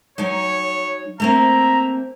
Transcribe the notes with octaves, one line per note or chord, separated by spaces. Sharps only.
F#3 D#4 C#5 G#5
A3 A#3 C4 E5 A#5